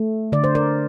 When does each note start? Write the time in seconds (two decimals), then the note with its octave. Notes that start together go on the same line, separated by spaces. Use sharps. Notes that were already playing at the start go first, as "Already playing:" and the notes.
Already playing: A3
0.32 D3 D5
0.44 C5
0.55 A#4 D5